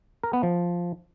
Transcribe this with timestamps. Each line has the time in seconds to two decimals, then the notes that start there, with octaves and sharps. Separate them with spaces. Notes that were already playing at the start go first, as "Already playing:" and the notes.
0.24 A#4
0.33 B3
0.43 F3